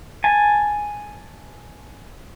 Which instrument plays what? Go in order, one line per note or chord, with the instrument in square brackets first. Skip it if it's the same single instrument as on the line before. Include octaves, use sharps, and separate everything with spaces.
[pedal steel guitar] G#5 A5